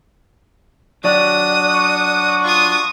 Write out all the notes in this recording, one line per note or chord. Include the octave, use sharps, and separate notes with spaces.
F#3 D4 F#4 D5 D#6
C#6
F4 C#6 D#6